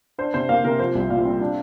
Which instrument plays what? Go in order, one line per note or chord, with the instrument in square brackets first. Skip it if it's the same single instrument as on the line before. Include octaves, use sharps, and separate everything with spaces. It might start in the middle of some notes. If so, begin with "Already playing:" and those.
[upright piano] D4 C5
C3 C5
A#3 F5
C3 A#4
F3 C5
C2
A#2 F5
C4
D4